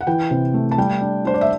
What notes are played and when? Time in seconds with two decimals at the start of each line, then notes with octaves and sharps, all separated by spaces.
0.01 F#5
0.07 E3 G5
0.31 C3
0.54 A3
0.71 A5
0.78 G3 G5
1.01 D4
1.25 D4 C5
1.34 D5
1.41 E5